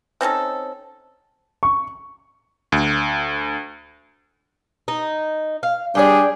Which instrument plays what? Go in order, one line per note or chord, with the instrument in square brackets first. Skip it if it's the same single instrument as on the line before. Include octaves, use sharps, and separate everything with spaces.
[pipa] C4 C#4 D#4 A4
[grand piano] C#6
[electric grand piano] D2
[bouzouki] D#4
F5
[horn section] G3 D4 G#4 [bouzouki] D5 G5